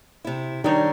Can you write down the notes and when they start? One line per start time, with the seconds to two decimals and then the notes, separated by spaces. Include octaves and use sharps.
0.25 C3 E4
0.64 D#3 G3 D4 D#4 C#5